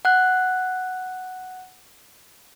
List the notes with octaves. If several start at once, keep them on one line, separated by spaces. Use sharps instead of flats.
F#5 F#6